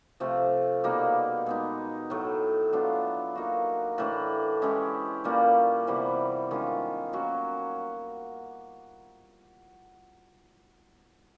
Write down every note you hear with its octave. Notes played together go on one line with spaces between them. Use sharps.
C3 F3 A3
B2 G3 A#3 D#4
G#3 B3 D#4
A2 F#3 A3
F#3 B3 D4 F4
A#3 D#4 F#4
A2 E3 A3 D4
G#3 C#4 E4 G4
A#2 G3 A#3 C#4
C3 E3 G3 B3
D#3 G#3 C#4 F4
F#3 A#3 C#4 F#4